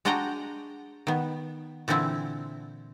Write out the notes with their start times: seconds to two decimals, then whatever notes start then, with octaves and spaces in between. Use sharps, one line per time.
0.05 G#3 D4 F#4 D#5 G5 A#5
1.07 D#3 B3
1.88 A#2 D3 E3 C4 E4